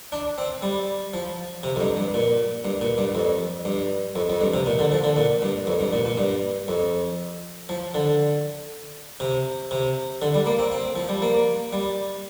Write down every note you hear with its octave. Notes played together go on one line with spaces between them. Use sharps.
D4
C4
G3
F3
C3
F2
G2
G2
A#2
G2
A#2
G2
F2
G2
F2
F2
G2
C3
A#2
D3
F3
D3
A#2
G2
F2
G2
A#2
A#2
G2
F2
F3
D3
C3
C3
D3
G3
A#3
C4
C4
F3
G3
A#3
G3